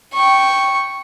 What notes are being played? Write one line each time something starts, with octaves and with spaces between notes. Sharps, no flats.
G5 C#6